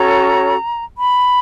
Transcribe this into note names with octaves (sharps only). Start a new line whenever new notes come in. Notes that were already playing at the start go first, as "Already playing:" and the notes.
Already playing: C#4 F#4 A4 C#5 A#5
B5